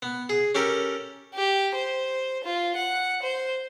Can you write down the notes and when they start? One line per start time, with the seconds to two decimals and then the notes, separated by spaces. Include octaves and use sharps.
0.02 B3
0.29 G#4
0.55 C#4 G4 A4 A#4
1.34 G4
1.75 C5
2.44 F4
2.75 F#5
3.22 C5